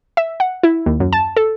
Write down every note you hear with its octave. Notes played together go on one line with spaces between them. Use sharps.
E5
F#5
E4
D#2
F#2
A5
A4